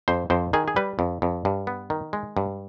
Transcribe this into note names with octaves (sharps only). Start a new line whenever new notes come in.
F2 C5
F2 C5
D#3 G#4
G#4
G3 B4
F2
F2
G2
B3
D#3
G#3
G2